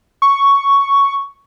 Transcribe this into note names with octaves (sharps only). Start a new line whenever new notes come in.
C#6